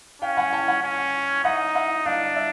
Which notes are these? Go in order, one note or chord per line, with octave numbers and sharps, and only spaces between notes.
C#4 F5 G5
F#5 G#5
G5 A5
F#5 G#5
C#4
D#4 E5 F#5
E5 F#5
D4 D#5 F5
D5 E5